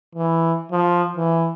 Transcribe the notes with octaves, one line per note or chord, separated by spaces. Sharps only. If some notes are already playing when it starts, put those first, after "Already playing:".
E3
F3
E3